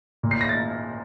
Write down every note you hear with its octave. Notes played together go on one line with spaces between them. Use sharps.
A#2
C7
A#6
A6